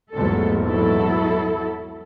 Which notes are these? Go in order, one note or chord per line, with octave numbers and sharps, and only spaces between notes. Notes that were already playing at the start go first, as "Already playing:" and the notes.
A#1 E2 G#2 F#3 A3 A4
F#3 E4 A4